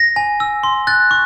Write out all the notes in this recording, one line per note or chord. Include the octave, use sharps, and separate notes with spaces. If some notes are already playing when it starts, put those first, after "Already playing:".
Already playing: A#6
G#5
E6
C6
F#6 A6
C#6